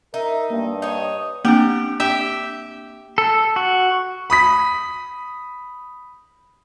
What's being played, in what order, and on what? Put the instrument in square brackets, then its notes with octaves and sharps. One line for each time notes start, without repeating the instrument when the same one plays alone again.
[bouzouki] D#4 [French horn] A#4 [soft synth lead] E5
[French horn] G2 [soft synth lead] A#3
[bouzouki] D#4 C#5 [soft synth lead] D#6
[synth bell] A#3 C4 D4 [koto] G4
[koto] G4 E5
[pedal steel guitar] A4
F#4
[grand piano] B5 D#6 B6